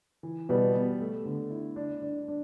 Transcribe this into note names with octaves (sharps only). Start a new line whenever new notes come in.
E3
B2 G3 B3
B3
A3
D3
E4
D4
D4
D4